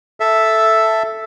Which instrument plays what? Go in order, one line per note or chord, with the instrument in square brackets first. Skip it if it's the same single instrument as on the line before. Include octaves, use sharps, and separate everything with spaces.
[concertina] A4 E5